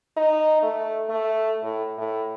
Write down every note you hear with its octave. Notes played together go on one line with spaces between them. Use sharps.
D#4
A3
A3
A2
A2